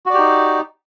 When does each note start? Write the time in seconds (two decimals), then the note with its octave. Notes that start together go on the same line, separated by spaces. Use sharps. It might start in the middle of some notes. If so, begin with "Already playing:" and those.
0.06 F#4
0.10 D5
0.14 G4
0.19 D#4